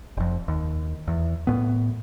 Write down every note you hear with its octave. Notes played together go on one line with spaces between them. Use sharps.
F1 F2
D#2
E2
A2 B3